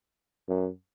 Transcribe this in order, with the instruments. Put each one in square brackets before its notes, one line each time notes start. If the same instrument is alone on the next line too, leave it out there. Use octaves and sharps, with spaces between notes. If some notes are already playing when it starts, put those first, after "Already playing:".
[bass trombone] F#2